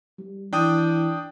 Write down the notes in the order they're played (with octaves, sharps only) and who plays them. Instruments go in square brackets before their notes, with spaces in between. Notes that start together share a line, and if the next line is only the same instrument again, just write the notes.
[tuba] G3
[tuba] E3 [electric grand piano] D4 G5 D#6